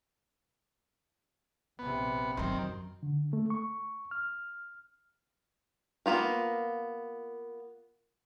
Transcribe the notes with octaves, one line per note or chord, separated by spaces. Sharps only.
A#1 C3 B3
F#2 D#3 F#3 C4
D3
A3
C#6
F6
A#3 B3 F4 A#4